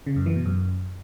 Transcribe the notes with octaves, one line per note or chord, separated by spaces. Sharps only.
C#3
F#2
E3
B2
F#2